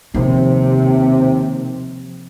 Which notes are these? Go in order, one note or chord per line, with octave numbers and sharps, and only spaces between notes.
D#2 C3 F3